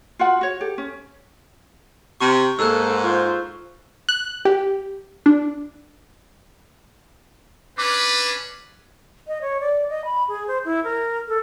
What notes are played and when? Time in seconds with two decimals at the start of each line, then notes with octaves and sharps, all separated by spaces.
0.19 F4 F#4 F#5
0.41 F#4 C#5
0.61 G4 A4
0.78 C#4
2.21 C3 C#6
2.59 G#2 A#3 A4 E6 F#6
3.04 F4 C5 C#6
4.09 F#6
4.45 G4
5.26 D4
7.78 C#4 D4 B4 D6
9.27 D#5
9.41 C#5
9.60 D5
9.90 D#5
10.05 B5
10.28 G#4
10.48 C5
10.65 E4
10.84 A#4
11.28 A4